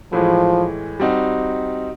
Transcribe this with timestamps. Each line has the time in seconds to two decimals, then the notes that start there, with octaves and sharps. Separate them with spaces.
0.12 A2 E3 F3 G#3
0.99 G3 C4 D#4 F#4